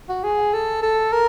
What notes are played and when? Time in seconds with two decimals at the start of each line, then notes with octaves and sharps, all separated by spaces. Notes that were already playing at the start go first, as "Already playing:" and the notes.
0.09 F#4
0.24 G#4
0.53 A4
0.83 A4
1.13 A#4